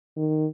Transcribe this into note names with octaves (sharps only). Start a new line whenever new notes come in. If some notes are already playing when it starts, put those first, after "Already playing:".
D#3